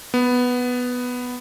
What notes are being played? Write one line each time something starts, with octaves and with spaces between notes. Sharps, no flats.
B3